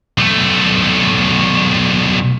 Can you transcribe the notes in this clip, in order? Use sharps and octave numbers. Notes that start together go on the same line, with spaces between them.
B1 A3